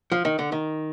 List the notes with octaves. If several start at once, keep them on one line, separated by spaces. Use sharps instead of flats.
F3
D#3
D3
D#3